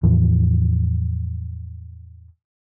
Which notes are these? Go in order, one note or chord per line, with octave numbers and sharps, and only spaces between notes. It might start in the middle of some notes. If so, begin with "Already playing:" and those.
E2 A2 E3 F3